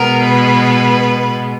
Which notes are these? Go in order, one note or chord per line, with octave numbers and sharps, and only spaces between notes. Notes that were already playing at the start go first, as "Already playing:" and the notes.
Already playing: B2 G#3 B3 A#4
B4